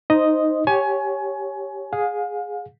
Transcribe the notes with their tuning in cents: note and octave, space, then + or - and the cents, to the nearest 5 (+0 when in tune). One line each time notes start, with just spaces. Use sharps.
D#4 +0 C5 +0 D#5 +0
G4 +0 C#5 +0 G#5 +25
G#4 +0 F5 +40